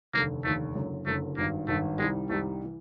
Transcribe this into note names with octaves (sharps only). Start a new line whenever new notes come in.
F1 D#2 D3 A#3
F1 D#2 D3 A3
F#1 F#2 D3
F#1 F#2 D3 A3
G#1 G2 D#3 A#3
G#1 G2 D#3 A3
C2 C3 D#3 G3 G#3
C2 C3 D#3 G3 A3
E3